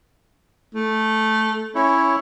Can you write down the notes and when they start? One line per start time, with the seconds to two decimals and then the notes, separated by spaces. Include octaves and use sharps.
0.75 A3
1.75 C#4 E4 C#5